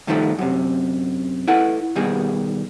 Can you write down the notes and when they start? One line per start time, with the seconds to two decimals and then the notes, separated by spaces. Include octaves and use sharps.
0.07 G2 D#3 F3 G3 A3
0.38 F#2 C3
1.48 E4 A4 B4 F#5
1.96 D#2 B2 G3 G#4